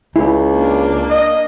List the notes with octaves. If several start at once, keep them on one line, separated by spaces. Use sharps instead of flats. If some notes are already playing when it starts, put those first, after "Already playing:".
C#2 E4
A#3 D4
D#5